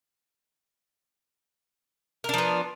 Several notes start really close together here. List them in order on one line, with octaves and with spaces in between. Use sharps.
A#4 D4 F3 B3